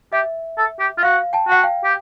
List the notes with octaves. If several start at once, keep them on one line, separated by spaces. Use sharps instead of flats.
G4 E5
A4
G4
F4
F#4 F5
G5 A5
F#4 F#5
F5 G5
G4